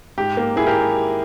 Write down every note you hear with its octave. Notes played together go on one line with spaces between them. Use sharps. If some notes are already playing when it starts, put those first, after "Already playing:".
G#2 G4
A#3
A#3 E4 G#4
G4 A#4